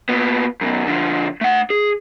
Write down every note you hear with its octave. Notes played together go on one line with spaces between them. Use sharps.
A#2 B3
F#2 B2
D3 F3
A3 F#5
G#4